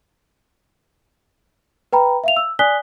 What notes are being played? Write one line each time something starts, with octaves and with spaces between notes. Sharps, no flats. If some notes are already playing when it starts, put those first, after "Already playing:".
B4 G5 A#5 B5
E5 F5 F7
E6
D5 G#5 D#6 F#6 B6 G7